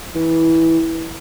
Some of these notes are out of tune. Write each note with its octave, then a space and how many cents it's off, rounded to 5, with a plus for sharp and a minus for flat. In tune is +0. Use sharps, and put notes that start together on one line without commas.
E3 -15